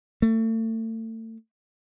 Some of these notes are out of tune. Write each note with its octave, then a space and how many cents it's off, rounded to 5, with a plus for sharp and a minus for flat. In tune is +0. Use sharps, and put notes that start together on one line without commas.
A3 +35